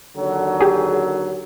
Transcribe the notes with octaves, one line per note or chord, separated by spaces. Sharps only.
D#2 D3 F#3
G4 G#4